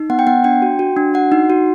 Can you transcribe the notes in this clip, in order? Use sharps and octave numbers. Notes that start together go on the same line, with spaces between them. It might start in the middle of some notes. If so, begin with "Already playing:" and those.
Already playing: D#4
B3 F#5
G5
B3 F#5
D4 G5
F#4
F#4
D4
F#4 F#5
D#4
F#4